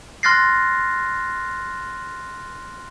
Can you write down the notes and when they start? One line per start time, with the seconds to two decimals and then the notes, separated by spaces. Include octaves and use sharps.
0.23 C6 F6 F#6 A6 A#6 C7